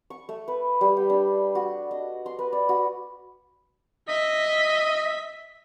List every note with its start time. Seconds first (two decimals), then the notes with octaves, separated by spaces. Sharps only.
0.10 C#6
0.29 A3
0.48 B4
0.81 G3
0.97 G5
1.10 D4
1.55 F#4
1.91 D#5
2.26 C6
2.39 B4
2.53 D5
2.69 F#4
4.09 D#5 E5 B6